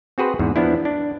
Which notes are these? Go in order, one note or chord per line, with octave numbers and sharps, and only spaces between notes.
C4 F#4 G#4 B4 C5
E2 G#2
F3 B3 D4 E4
D4